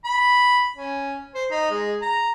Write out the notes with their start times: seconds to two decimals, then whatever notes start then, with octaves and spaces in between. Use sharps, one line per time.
0.05 B5
0.77 C#4
1.35 C5
1.51 D#4
1.70 G#3
2.02 A#5